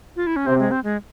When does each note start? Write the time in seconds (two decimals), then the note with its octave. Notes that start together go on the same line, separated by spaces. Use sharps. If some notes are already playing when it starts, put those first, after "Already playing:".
0.16 F4
0.27 E4
0.36 C#4
0.46 C3 C4
0.59 G#3
0.71 C4
0.84 G#3